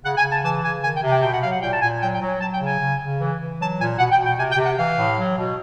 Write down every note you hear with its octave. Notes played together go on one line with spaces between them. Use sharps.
C#3 F#5
G#5
C#3
A5
E3 A5
C#3 G#5
D#3 G#5
G5
C3
G5
B2 G5
F#5
F#3 F5
F#5
A#2 G5
A5
A#2 G#5
F#3 G5
G5
F#3
G#5
F#3 A5
G5
C#3
G#5
C#3
C#3
E3
E3
F#3 A5
A#2 G#5
B2 F#5
G5
B2
G5
C3 G#5
G5
C3
F#5
E3 F5
A2
F#3
B2